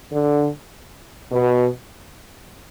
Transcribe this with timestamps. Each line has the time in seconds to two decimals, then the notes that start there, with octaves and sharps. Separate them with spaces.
0.11 D3
1.32 B2